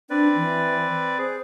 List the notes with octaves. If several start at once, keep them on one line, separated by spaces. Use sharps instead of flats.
C4 D4 B4 D5
E3
G#4 C5